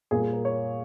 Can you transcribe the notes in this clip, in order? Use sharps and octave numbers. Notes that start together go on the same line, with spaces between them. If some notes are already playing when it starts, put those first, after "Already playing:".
A#2 G3 A#3 G#4
G#4
A#4
C#5